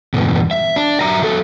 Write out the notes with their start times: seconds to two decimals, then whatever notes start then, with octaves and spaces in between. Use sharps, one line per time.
0.14 E2 G2 B2
0.51 E5
0.76 D4
1.01 F#3 E5 A#5
1.23 F#3 A4